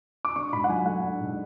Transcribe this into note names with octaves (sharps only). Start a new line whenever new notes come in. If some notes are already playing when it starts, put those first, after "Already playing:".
D6
D4 C#6
G#2 B5
F#5
F#3 G#5
A3 F#5
D4
G#2